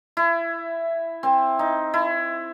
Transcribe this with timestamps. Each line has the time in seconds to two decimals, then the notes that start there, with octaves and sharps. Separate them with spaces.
0.17 E4
1.23 C4
1.59 D#4
1.94 E4